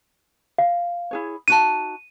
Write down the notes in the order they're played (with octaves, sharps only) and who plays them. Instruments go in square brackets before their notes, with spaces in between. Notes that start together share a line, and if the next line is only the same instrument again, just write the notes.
[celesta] F5
[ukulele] E4 G#4 C#5
[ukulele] D#4 F#4 A5 [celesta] D#7